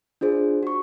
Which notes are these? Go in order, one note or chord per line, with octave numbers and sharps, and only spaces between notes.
D4 F4 G#4 C5
F#4 C#6